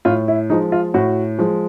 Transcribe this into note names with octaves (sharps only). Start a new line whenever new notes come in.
A2 F4
E4
F3 G#3 D#4
F4
A2 F#4
F3 G#3